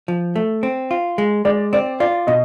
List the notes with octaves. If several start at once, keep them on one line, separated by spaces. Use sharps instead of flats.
F3
A3
C4
F4
G#3
G#3 D5
C4 D5
F4 D5
B2 D#5